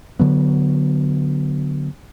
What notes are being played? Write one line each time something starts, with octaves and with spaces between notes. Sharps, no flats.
D3 F#3 B3